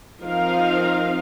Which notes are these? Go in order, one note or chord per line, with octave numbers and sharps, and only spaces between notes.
F3 C4 D#4 A#4 F5